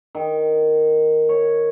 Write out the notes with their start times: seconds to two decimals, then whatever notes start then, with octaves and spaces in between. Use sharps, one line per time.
0.15 D#3
1.29 C#5